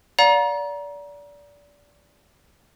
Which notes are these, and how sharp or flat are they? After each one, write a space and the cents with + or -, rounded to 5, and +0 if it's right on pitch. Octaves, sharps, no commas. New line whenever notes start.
D5 -25 F5 +45 A#5 +25